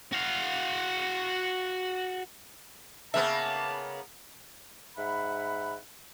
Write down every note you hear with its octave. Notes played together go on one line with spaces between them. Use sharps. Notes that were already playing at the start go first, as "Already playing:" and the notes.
F#4 F5
C#3 A#3 B3 E5 A5
G#2 E5 F#5 B5